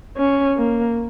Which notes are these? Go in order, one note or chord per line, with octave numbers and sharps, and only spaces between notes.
C#4
A#3